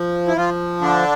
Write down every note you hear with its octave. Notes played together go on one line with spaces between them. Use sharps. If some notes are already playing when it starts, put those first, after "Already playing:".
Already playing: F3
E4
F3 F4
D3 D4